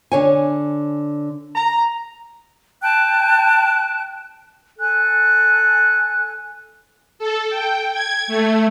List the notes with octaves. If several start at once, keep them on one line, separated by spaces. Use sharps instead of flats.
D3 C#5 G#5
A#5
G5 A5 F#6
A4 G#5 F#6
A4
G5
G#6
A3